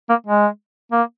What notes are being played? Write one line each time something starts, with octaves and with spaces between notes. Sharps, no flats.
A#3
G#3
A#3